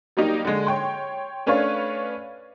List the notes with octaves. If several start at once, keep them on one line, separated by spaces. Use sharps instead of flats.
F#3 G3 A#3 D#4 G4
D3 G#3
C#5 G5 C6
A3 C#4 D4 B4 C#5 F5